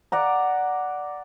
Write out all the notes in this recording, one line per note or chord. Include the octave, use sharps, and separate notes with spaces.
D5 F#5 A#5